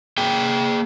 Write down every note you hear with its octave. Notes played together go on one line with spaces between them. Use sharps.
A#3 G#4 G5